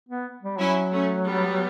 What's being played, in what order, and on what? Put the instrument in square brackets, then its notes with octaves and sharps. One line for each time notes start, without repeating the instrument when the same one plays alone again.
[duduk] B3
G3
[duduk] F#3 [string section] C#4 E4
[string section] A3 C#4
G3 B3